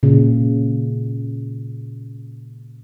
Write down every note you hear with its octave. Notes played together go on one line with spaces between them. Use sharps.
A#2 C#3